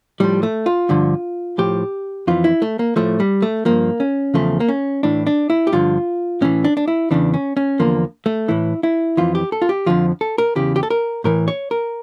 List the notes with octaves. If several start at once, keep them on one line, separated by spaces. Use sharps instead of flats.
A2 F3 G3
A3
F4
G2 D3 F3
A2 F3 G4
F2 E3 F4
E4
A3
A#3
A2 F3 A3
G3
A3
G2 F3 A#3
C#4
E2 C#3 F3 A3
A#3
C#4
A2 E3 D4
D4
E4
G4
G2 D3 F3 F4
A2 E3 C#4
D4
D4
E4
E2 C#3 E3 D4
C#4
C#4
E2 D3 F3 A#3
A3
A2 E3 E4
E4
F2 E3 F4
G4
A4
F4
G4
F2 D3 F3 F4
A4
A#4
E2 C#3 E3 G4
G4
A4
A#4
A2 E3 A#4
C#5
A#4